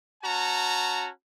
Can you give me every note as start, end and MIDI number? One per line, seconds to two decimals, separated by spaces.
0.23 1.08 61
0.23 1.08 66
0.23 1.08 81
0.23 1.08 82